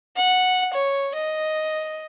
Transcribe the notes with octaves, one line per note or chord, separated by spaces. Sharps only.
F#5
C#5
D#5